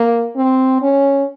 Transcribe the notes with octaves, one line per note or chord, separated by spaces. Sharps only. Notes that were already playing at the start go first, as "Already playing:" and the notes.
Already playing: A#3
C4
C#4